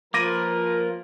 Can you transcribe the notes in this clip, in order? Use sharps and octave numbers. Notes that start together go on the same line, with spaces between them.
F3 A#3 F4 A#4 B4 D6 A#6 D#7